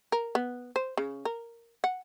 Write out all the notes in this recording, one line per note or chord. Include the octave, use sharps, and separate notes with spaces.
A#4
B3
C5
C#3
A#4
F#5